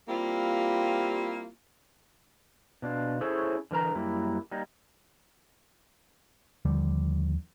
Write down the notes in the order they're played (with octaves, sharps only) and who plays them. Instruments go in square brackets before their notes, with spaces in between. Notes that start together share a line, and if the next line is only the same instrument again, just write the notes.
[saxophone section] G3 A#3 C4 E4 F4 G4
[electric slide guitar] B2 D4 F4
C#4 E4 G#4 A4 C5 C#5
D3 E3 A#4 A#5
F#2 G3 A#3 E4
G3 A#3 D#4
[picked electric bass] D#2 D3 F3 G3